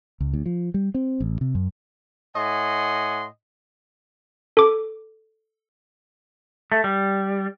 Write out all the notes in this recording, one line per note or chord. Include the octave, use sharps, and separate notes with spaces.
C#2
D2
F3
G3
C4
A1
C3
F#2
A2 D#5 F#5 G#5 C6
A4 D6
A3
G3